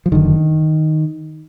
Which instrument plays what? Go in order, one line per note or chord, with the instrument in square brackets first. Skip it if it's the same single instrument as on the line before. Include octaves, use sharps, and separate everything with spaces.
[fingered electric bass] F3
F#1 F#2 D3 D#3